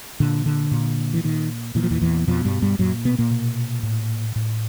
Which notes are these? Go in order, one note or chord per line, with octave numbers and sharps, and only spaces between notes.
A#2 D3
D3
A#2
E3
A#2 D#3
A#2 E3
F3
E2 E3
E2 E3
F2 B2 F3
G2 G3
G2 G3
F#2 A#2 F#3
B2 B3
A#2 A#3
B2
A2
A2